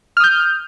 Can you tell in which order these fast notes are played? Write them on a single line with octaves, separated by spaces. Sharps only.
F6 D#6 G6